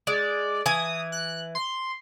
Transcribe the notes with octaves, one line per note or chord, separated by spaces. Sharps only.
G#3 D5
E3 G#5 D#6
F#6
C6